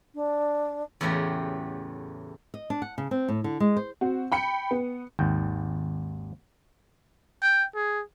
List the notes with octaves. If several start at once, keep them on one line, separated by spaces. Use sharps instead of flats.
D4
E2 A2 C#3 A3 F#4 G4
D#5
D4
F#5
C#3
C4
A2
D3
G#3
C5
C4 F#4
G5 B5 C#7
B3
G#1 D#2 G5
G5
G#4